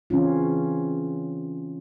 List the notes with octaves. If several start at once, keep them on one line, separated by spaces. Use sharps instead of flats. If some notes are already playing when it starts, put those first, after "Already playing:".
C#3 E3 C4 C#4 F4